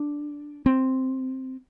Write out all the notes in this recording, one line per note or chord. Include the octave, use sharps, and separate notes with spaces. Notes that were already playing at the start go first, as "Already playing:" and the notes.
Already playing: D4
C4